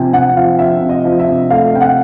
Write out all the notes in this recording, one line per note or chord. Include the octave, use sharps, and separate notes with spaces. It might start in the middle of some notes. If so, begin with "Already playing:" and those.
Already playing: C3 F3 G5 G#5
C3 F#5
F#5
F3 F5
F3 E5
C3
D#5
F3
E5
C3
A3 F5
C3 G5
F#5